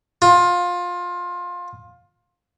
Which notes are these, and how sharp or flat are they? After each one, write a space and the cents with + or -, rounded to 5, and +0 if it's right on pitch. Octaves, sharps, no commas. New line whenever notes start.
F4 +20